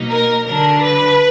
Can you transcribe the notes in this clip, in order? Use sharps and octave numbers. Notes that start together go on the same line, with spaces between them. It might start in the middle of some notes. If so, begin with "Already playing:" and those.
Already playing: B2 F#3 A#3 D#4
A#4
D3 F#3 D4 A#4
B4